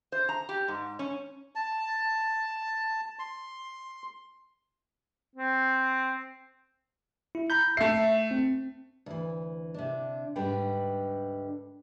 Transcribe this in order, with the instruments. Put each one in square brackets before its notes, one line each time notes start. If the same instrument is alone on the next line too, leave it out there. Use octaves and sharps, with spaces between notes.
[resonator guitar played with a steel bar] C5
A#5
G4
G#2
C#4
[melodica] A5
C6
[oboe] C4
[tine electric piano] E4
A#5 B5 G6
[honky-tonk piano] A3 C7 [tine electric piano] E5
[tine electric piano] C4
[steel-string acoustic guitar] D2 E3
C3 D4
D2 G#2 D3 G3 B4 G5